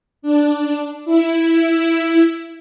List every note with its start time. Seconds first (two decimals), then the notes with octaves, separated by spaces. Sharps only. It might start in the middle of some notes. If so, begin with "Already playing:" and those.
0.22 D4
1.05 E4